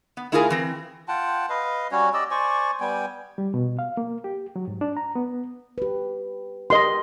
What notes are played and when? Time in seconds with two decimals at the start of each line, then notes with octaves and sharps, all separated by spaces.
0.17 B3
0.32 A3 E4 F4 G#4 A#4 G#5
0.50 E3 C4
1.08 F4 F#5 G5 A5
1.49 B4 D#5 F5
1.92 G3 C#4 F#4 C#5
2.14 G4 D5 D#5 E6
2.31 C5 D5 G#5 C#6
2.80 G3 B3 G5 G#5
3.38 G3
3.54 B2
3.79 F5
3.97 A#3
4.24 G4
4.56 F#3
4.68 G#2
4.81 D4
4.97 A#5
5.15 B3
5.78 G4 B4
6.70 G4 A#4 D#5 C6